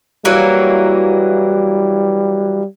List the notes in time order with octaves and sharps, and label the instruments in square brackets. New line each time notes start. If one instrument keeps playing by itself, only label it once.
[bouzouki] E3 F#3 A#3 [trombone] G3